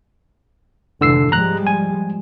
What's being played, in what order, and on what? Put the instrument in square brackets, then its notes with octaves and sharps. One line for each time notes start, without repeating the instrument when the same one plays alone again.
[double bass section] F1 G#2 E3 [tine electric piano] D3 E6 C7
[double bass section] F3 G3 G#3 [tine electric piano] A#5 F#6
[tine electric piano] G#5